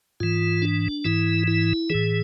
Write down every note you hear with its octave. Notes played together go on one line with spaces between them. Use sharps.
G#2 E3 F4
D4
G#2 E3 E4
E4
A2 E3 G#4